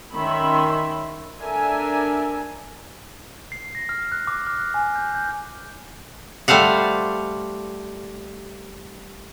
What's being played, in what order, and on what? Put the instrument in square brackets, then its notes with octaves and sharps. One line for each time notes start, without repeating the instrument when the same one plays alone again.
[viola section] D#3 C#4 E5 B5 C6
D4 A4 A#4 D5 E5 G#5
[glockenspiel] C7
A#6
F6
F#6
D6
F6
F#6
G#5
G6
G6
[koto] G3 A3 C5 F5 F#5